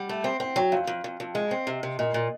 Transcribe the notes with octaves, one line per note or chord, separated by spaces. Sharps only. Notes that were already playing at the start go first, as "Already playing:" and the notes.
Already playing: G3 F#5
A3
C4
C4 G5
F#3 G5
F2 F5
F2
F2
F2
G#3 D#5
C4
C3
C3
A#2 D#5
A#2